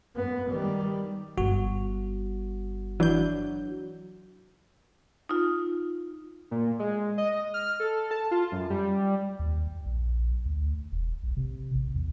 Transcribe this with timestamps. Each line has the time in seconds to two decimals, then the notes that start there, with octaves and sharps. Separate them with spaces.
0.15 F#2 B3
0.49 D#3 G3
1.38 G1 F#4
3.00 E3 F#3 D4 G6
5.29 D#4 F4
6.51 A#2
6.79 G#3
7.18 D#5
7.54 F6
7.80 A4
8.11 A5
8.31 F4
8.52 F#2
8.70 G3
9.39 D#2
9.86 A#1
10.46 D2
10.92 E1
11.23 A#1
11.37 C3
11.75 A1
11.95 E2